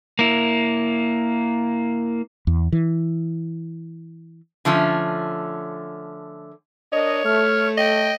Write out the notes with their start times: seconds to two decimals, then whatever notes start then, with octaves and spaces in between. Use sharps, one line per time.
0.19 A#3 E4
2.47 E2
2.72 E3
4.65 D3 F3 A3 C#4
6.93 D4 A#4 C#5 D#5
7.25 A3 F6
7.77 D#5 G5